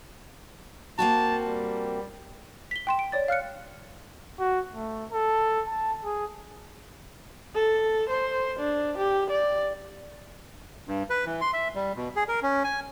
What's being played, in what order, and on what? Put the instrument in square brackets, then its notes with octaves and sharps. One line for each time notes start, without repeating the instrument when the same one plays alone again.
[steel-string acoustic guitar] A#3 C4 F#4 [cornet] A5
[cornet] G3
[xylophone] B6 G7
G5 C6 E7
D7
C#5 D5 A6
F5 F6 F#6 C#7
[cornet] F#4
A3
A4
A5
G#4
[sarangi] A4
C5
D4
G4
D5
[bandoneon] G2
B4
E3
C6
E5
G3
B2
G#4
A#4
C#4
G#5